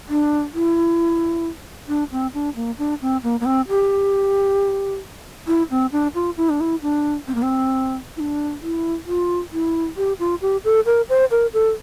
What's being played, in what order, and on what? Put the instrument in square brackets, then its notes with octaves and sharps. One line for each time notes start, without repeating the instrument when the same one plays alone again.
[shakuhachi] D4
E4
D4
C4
D4
A#3
D4
C4
A#3
A#3
C4
G4
E4
C4
D4
F4
E4
D4
E4
D4
C4
A#3
C4
E4
D4
E4
F4
E4
G4
F4
G4
A4
A#4
C5
A#4
A4